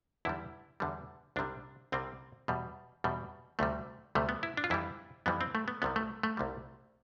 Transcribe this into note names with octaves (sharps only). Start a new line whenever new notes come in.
E2 D3 G3 E4
E2 D3 G3
C2 C3 G3 D4
C2 C3 G3 C4
E2 B2 G3
E2 B2 G3
D2 C3 G3 A3
D2 C3 G3 A3
B3
E4
D4
F4
F2 E3 G3 E4
F2 E3 G3 B3
C4
A3
B3
C2 C3 G3 B3
A3
A3
C2 C3 G3